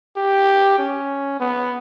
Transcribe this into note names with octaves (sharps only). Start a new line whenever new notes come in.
G4
C#4
B3